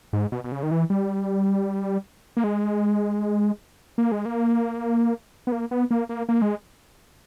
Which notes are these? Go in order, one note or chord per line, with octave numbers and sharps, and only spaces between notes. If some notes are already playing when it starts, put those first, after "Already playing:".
G#2
B2
B2
C#3
D#3
E3
G3
A#3
G#3
A#3
G#3
A#3
B3
A#3
B3
A#3
A#3
A#3
G#3